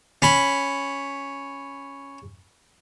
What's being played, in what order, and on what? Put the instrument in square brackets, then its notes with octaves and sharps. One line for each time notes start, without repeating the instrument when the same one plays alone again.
[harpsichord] C#4 B5